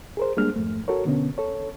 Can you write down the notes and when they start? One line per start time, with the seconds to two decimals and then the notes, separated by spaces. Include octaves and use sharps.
0.17 G#4 A#4 C5
0.37 G3 G#3 A#3 D4 G#4 F6
0.56 F2 G#2 A3
0.88 F#4 A4 A#4 C#5
1.05 B2 D3 B3 C#4
1.38 A4 C#5